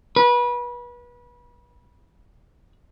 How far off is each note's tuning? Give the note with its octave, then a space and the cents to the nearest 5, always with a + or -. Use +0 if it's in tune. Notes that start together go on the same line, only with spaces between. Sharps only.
B4 -30